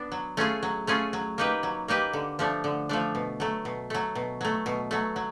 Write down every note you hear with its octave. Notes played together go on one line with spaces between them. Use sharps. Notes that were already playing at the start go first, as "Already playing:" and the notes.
Already playing: B3 D4
F#3
A3 C#4 F4 G#4
F#3
A3 C#4 F4 G#4
F#3
A#3 D#4 G4 B4
F#3
A#3 D#4 G4 B4
D3
F3 A3 D4
D3
F3 A3 D4
B2
F#3 A3
B2
F#3 A3
B2
F#3 A3
B2
F#3 A3
F#3